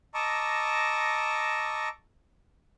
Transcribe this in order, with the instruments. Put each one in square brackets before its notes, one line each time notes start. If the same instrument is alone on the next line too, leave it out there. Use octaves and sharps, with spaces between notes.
[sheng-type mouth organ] D#5 A5 A#5 C#6 D6 E6